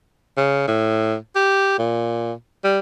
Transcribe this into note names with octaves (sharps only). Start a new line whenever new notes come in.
C#3
A2
G4
A#2
G3